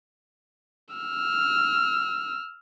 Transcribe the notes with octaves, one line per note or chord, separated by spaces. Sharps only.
E6 F6